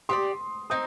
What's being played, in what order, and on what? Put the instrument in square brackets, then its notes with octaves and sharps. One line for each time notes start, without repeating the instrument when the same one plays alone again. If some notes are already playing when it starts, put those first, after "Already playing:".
[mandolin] G4 B4 D5 [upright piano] C6 D#6
[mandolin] C4 D#4 [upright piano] D#6 G6